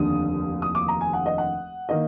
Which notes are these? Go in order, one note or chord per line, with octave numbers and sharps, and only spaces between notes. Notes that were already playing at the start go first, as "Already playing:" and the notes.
Already playing: F1 D#2 D3 D#6
D#6
D6
A#5
G#5
F#5
D#5
F#5
D#3 A#3 D#5